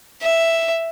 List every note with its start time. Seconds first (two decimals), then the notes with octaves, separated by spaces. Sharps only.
0.22 E5